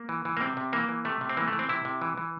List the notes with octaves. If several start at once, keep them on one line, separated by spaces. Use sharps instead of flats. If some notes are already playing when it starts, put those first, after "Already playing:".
Already playing: A#3
E3
E3
A#3
C3 C4
C3
E3 A#3
E3
C3 A3
C3
C4
E3 A#3
A3
E3
C4
C3 E4
C3
E3
E3